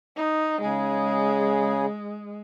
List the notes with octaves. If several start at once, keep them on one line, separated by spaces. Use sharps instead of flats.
D#4
C#3 G#3 G#4